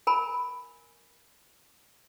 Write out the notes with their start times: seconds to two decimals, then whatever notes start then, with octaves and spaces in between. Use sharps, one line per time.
0.07 A#4 G#5 B5